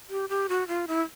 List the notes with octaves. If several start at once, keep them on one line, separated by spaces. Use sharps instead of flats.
G4
G4
F#4
F4
E4